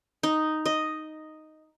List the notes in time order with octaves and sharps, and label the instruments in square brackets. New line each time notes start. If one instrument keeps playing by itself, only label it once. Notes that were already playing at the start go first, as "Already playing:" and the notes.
[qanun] D#4
D#5